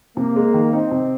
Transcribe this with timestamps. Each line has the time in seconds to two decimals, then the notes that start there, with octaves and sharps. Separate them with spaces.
0.17 C3 A#3
0.36 G#3
0.54 D#3
0.73 C4 D#4
0.91 C3